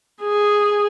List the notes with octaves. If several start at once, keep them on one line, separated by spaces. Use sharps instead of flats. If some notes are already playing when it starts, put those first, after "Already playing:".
G#4